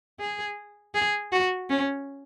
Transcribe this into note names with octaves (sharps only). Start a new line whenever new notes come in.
G#4
G#4
F#4
C#4